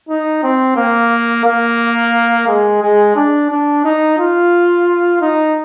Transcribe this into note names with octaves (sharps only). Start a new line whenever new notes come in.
D#4
C4
A#3
A#3
G#3
G#3
D4
D4
D#4
F4
D#4